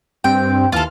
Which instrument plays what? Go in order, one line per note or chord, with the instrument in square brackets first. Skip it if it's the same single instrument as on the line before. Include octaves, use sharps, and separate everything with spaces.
[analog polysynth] G2 C4 [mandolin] G5
[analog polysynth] D#2 E3 F6 [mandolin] F4 A4